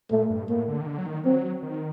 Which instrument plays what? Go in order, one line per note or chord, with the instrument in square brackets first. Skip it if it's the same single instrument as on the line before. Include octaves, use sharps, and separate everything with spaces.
[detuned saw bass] A#2 [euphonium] A3
[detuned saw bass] G2
[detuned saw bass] A2 [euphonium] A#3
[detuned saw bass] D3
D#3
D3
F#3
D#3
[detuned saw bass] F#3 [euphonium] C4
[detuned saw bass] D#3